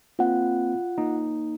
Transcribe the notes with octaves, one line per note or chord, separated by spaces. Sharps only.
A#3 C4 F4 F#5
A#3 D#4